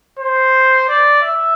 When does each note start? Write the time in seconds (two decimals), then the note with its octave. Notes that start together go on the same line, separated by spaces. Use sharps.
0.19 C5
0.89 D5
1.22 E5